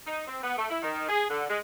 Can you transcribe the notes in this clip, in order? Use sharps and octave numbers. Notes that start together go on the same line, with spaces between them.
D#4
C4
B3
A3
E4
D#3
G#4
D3
G#3